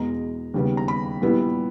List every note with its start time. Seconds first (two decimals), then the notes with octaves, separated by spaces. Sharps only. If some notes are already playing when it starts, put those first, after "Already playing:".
Already playing: E2 B2 G#3 B3 A#5
0.54 D#2 C#3 G3 B3
0.77 A#5
0.88 B5
1.22 A#2 G3 B3 E4